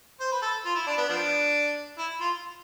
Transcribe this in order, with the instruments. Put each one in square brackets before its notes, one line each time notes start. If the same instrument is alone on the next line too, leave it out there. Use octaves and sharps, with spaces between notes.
[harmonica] C5
B4
A4
F4
E4
D4
B3
F3 B3 D4
E4
F4